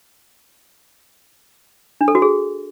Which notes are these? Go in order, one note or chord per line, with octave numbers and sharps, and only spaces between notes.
D4
A4
F#4
G#4